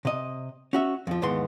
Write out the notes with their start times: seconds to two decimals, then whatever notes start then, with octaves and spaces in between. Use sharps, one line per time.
0.05 C3 D#5
0.73 C#4 F#4 E5
1.07 F2 F3
1.22 D#2 G#2 E3 B3 C6